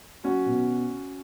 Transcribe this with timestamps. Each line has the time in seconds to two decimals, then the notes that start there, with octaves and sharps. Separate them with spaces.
0.24 F#3 C#4 F#4
0.46 B2